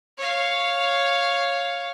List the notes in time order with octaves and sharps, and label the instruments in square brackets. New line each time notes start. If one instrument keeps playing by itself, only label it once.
[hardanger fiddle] C#5 F5